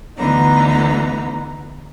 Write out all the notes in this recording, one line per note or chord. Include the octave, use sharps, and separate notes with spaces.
D2 D3 E3 B3 D#4 A#5